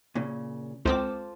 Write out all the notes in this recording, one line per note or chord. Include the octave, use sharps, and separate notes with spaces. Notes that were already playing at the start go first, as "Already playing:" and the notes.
A#2 C#3
C#2 C4 F4 A4 C5 D6